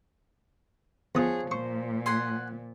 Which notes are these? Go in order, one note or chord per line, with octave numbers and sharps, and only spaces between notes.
E2 F3 G#4 C#5 F#5 D#6
A#2 C5 C#6
F#5 G#5 C6